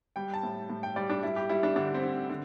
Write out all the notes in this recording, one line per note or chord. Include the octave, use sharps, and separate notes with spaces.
G3 G5
A5
A2
A2
G5
G3 D5
D4
G3 E4
G4
G3 E4
D4
D3 D4
C4
D3
D3